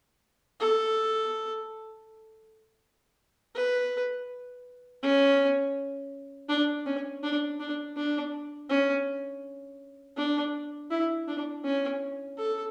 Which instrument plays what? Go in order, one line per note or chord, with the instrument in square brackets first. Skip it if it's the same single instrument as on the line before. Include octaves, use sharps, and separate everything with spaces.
[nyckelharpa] A4
B4
C#4
D4
C#4
D4
D4
D4
C#4
D4
E4
D4
C#4
A4